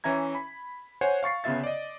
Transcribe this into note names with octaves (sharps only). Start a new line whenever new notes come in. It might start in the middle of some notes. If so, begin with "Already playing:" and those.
E3 C#4 E5 A#5 G#6
B5
C5 C#5 F#5 G#5
F5 C#6 A6 C7
G1 C#3 B3 F4 E5 A6
D5 D#5